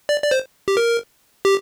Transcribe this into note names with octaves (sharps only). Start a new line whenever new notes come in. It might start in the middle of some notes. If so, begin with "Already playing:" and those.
D5
D5
C5
G4
A#4
G4